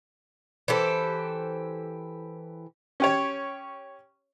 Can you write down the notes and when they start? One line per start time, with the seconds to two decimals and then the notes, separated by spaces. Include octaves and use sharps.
0.68 E3 G4 A4 C5
3.00 C#4 G4 C#5